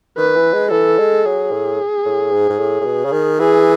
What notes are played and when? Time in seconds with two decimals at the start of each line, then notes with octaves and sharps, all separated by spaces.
0.17 D#3 B4
0.35 E3
0.53 G#3
0.71 E3 A4
0.99 G#3
1.25 F#3 G#4
1.51 A2
2.05 A2
2.32 G#2
2.50 G#2
2.59 A2
2.81 A2
2.85 B2
3.05 C#3
3.12 D#3
3.39 E3 G#4